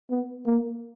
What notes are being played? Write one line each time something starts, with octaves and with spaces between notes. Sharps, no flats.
B3
A#3